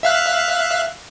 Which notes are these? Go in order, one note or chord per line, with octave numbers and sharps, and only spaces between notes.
E5 F5 F#6